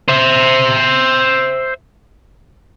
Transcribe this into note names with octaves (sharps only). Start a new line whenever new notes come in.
C5 E5